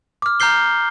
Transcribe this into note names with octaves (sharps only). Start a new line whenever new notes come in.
D6 F6
A#5 F6 G6 C7 G7